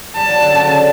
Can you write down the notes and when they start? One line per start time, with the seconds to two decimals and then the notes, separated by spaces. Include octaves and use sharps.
0.16 G3 A5
0.29 F#3
0.42 D3
0.55 C#3
0.67 D3